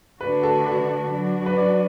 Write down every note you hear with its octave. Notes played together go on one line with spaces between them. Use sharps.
D3 A3 D4 F#4 B4
A4
B4
F#3 D4 F#4
B4
D5